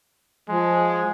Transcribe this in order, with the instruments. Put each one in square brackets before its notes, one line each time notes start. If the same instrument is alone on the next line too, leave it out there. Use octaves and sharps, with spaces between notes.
[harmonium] F3 [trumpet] G#3